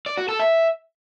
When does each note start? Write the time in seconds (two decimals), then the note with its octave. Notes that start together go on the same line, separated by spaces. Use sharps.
0.06 D5
0.17 F#4
0.28 A4
0.40 E5